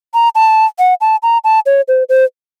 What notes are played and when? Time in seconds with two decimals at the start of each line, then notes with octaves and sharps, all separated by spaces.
0.14 A#5
0.35 A5
0.79 F#5
1.01 A5
1.23 A#5
1.44 A5
1.66 C#5
1.88 C5
2.09 C5